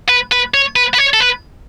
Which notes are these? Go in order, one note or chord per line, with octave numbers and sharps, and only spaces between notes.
B4
B4
C#5
B4
B4
C#5
A4
B4